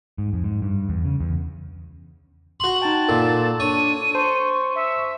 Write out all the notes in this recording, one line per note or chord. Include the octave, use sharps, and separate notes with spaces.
G#2
F2
G#2
G2
E2
C#3
E2
F#4 C6 F#7
D#4 G5 A5
A#2 A4
D4 C#5 D#7
C5 A5 C6 C#6
E5